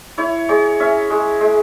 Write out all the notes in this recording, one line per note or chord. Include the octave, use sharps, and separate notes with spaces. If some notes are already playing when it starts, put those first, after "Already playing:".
E4 C#5
G#3 C#5
C#4 E5
G#3
G#3